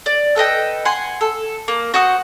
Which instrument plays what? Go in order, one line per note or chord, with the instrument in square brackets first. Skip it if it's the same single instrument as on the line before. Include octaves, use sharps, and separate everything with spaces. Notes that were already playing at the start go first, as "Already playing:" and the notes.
[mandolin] D5
A4 B4 D#5 G5
F#5 G#5 C6
A4
A#3
F#4 C5 F#5 D#6